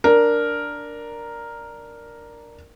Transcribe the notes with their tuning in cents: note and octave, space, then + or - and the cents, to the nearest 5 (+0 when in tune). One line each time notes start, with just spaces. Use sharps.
D4 +0 A#4 +0